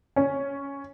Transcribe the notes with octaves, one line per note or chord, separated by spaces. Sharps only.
C#4